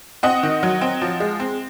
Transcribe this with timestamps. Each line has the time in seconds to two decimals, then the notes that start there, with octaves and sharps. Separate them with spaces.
0.23 C4 D#5 F#5
0.43 D#3
0.63 F#3
0.81 C4
1.02 F3
1.20 G#3
1.40 C4